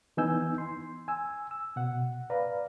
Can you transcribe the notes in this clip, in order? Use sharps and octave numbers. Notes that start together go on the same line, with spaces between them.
E3 B3 D#4 G#5 E6 G6
C6
G#5 E6
E6
B2 F#5
B4 D5 F5 A#5